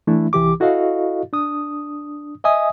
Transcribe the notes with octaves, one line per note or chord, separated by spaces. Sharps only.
E3 A3 D4 E4
C2 E3 G4 D6
E4 F#4 A4 D#5 F5
D4 D#6
D#5 E5 G#5 D#6